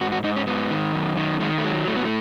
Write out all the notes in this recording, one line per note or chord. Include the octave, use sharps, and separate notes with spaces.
G#2 F#4
F#4
G#2 D#4
C#4
G#2 B3
D#3
F#2
D#3
D#3 G#3
A3
F#3 G#3
A2 A3
B3
A3